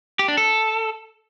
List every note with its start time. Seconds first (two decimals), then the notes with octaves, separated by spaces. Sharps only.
0.19 G4
0.28 D4
0.37 A4